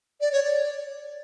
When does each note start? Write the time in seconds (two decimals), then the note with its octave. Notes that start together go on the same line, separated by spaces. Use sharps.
0.21 D5
0.32 C#5
0.44 D5